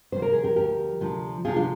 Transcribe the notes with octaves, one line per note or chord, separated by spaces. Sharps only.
D2 C3 F3 C5
A#4
G#4
G4 A#4
D2 C3 F3 G4 A#4
D2 C3 F3
D2 C3 F3 F4 G#4
D4 F4